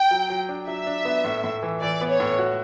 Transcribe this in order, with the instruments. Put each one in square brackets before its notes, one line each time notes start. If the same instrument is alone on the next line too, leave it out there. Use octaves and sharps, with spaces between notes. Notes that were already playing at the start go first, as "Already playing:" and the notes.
Already playing: [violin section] G5
[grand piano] F#3
F#3
D4
[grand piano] F#3 [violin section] E5
[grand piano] D4
B3
A2
A2
E3
[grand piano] E3 [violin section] D5
[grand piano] B3
[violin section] C#5
[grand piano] A2
F#4